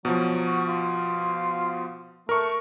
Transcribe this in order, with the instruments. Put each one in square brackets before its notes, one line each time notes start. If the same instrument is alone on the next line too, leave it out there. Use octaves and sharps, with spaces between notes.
[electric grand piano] B2 F3 [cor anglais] F#3
[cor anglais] F#4
F4
[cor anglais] A3 [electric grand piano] A#4 C#6